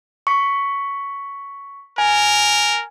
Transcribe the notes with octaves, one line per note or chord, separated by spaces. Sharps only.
C#6 B6
A#4 G#5